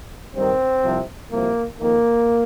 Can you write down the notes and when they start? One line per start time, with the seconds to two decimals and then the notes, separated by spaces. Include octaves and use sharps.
0.35 G2 D#3 C4
0.83 C2 C3 F3
1.31 C2 C3 F3 A#3
1.79 F2 D#3 A#3